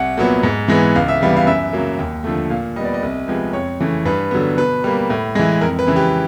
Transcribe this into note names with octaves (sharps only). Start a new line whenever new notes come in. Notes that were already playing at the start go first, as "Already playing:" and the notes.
Already playing: C2 F#5
A#2 F#3 B3
G#2
E3 G#3 B3
C#2 F5
E5
C3 E3 G3 B3 F5
F5
F#2 E5
C#3 F#3 A#3
D#2
D3 F3 A3
A#2 F5
G3 B3 D5 D#5
D#5
C2
C3 F3 G#3 B3
F2 C#5
C#3 E3 A3
G2 B4
D3 F#3 B3
B2 B4
G3 A#3
A2
E3 G#3
F2 A#4
B4
C#3 E3
G4